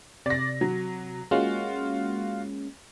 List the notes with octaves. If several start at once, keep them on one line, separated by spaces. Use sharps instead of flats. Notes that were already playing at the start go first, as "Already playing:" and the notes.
C3 D5 A#6
F#3
G#3 A#3 C#4 F4 F#4